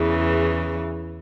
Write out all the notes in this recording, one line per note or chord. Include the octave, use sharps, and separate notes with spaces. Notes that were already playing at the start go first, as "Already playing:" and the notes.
Already playing: E2 C#3 E3